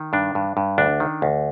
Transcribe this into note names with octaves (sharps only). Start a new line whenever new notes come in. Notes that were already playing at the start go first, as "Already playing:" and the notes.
Already playing: D#3
G2 D4
G2
G2
D2 D4
D#3
D2